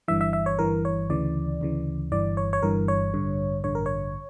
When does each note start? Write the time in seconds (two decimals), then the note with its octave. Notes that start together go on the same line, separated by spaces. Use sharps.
0.08 G1 G2 E3 E5
0.21 E5
0.33 E5
0.46 C#5
0.59 G1 G2 E3 A#4
0.85 C#5
1.09 D2 C#3 E3 D5
1.61 D2 C#3 E3
2.12 G1 G2 E3 D5
2.37 C#5
2.53 C#5
2.63 G1 G2 E3 A#4
2.88 C#5
3.14 A1 G2 D3
3.64 A1 G2 D3 C#5
3.75 A#4
3.86 C#5